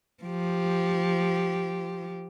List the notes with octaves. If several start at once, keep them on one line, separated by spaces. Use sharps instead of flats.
F3 G4